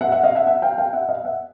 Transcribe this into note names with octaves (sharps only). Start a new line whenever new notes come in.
E5 F#5
E5 F#5
D#5 F5
E5 F#5
E5 F#5
F5 G5
F5 G5
E5 F#5
D#5 F5
E5 F#5